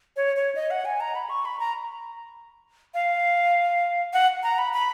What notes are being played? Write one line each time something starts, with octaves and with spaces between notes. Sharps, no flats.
C#5
C#5
D#5
F#5
G#5
A#5
B5
C#6
B5
A#5
F5
F#5
A#5
B5
B5